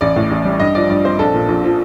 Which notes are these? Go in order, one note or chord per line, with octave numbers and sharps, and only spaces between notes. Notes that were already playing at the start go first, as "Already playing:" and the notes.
A1 D5
A2
A1
G3
G2 D#5
F3 D5
G2 D5
C4 C5
A#1 A4
A#2
A#1
F3